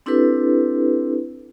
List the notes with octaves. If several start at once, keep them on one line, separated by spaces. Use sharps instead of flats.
C4 D4 E4 G4 A4 B4